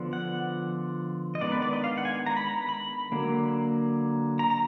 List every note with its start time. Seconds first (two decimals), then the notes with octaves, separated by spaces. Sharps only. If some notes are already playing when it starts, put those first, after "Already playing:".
Already playing: D3 F3 B3 D4
0.13 F#5
1.35 D#5
1.41 D#3 G#3 B3 D4 D5
1.52 B4
1.62 D5
1.73 D#5
1.84 F5
1.98 F#5
2.05 G#5
2.26 A#5
2.37 B5
2.47 A#5
2.69 B5
3.12 D3 F#3 A#3
4.39 A#5
4.50 A#5